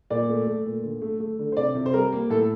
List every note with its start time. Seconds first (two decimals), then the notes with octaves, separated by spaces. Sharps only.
0.10 A#2 D5
0.29 A3
0.47 A3
0.66 A#2
0.84 D3
1.02 A3
1.20 A3
1.39 D3
1.52 C5
1.57 C3 D5
1.75 C3
1.86 C5
1.94 G3 A#4
2.12 A#3
2.30 A2 A4